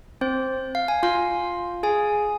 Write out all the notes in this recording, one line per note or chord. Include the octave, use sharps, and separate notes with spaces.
C4 C5
F5
G#5
F4 F5
G#4 G#5